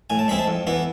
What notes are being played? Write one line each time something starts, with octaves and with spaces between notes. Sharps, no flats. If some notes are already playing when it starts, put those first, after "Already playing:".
A2 G#5
A5
G#3 C4 E4 B5
A5
F2
E3 B3 E4